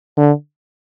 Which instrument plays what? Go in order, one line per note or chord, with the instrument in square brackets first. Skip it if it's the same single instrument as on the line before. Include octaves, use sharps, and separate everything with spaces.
[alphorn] D3